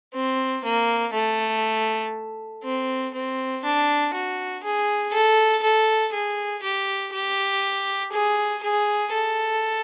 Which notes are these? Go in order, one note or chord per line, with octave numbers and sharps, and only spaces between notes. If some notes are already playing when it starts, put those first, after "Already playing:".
C4
A#3
A3
C4
C4
D4
F#4
G#4
A4
A4
G#4
G4
G4
G#4
G#4
A4